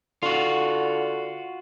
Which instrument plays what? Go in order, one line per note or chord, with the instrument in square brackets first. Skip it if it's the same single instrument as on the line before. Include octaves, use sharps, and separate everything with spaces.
[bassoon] D3 [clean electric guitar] F4 F#4